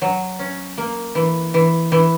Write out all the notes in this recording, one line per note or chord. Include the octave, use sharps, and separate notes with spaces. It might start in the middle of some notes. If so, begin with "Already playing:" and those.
F#3
C#4
A#3
E3
E3
E3